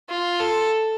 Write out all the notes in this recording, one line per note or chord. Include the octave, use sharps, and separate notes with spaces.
F4
A4